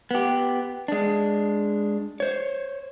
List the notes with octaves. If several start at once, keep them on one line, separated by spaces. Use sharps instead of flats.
B3 G4
G#3 D4
C5 C#5